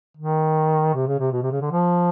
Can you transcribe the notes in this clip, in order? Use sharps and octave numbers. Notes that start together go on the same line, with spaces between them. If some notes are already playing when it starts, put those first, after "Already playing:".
D#3
C3
C#3
C3
B2
C3
C#3
D3
F3